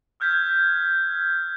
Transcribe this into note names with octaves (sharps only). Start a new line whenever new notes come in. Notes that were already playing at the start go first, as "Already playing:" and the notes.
E6 F6 G6 G#6 B6